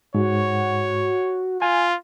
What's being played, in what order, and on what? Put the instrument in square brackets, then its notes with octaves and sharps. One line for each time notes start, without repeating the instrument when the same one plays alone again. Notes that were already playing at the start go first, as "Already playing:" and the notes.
[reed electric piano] G#2 [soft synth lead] F#4 [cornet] C#5
[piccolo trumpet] F4 [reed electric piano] G#5